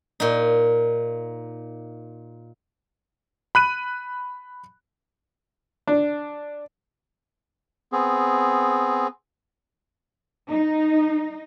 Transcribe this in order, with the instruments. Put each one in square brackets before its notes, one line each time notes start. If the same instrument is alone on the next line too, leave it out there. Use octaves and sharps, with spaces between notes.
[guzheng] A#2 D#4
[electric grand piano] B5 F#6 D#7
[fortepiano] D4
[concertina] B3 C4 G#4
[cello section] D#4